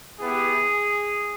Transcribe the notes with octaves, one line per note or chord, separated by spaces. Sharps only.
B3 E4 G4 G#4